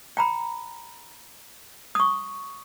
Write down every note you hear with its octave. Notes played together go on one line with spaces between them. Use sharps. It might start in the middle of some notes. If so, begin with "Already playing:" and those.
G5 A#5 B5
C#6 D#6